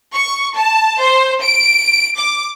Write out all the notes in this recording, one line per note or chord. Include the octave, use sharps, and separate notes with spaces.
C#6
A5
C5
D7
D6